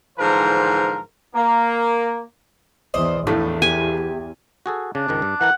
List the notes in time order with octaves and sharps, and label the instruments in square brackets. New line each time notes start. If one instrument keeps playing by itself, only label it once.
[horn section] G#2 D3 E3 F3 A#4 C5
A#3
[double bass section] E2 [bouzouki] C5 D5 D#5
[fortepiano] A#1 A2 A3 [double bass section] E2 [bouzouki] D#4
[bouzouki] G4 [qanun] G#5
[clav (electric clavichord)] F#4 G#4 A4
[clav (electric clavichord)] C#3 [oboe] D4
[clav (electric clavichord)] C#2 G#2 D#3
G2
[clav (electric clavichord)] E3 A#4 A5 [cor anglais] F#5